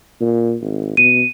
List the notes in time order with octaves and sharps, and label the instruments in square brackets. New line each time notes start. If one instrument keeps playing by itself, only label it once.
[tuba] A#2
G#1
[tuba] B2 [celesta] D#7